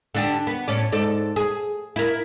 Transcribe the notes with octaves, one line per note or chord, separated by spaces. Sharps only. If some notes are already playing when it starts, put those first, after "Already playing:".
D3 D4 G4
B3
A2 C#4 D5
G#2 A4 D5
G#4
E4 A#4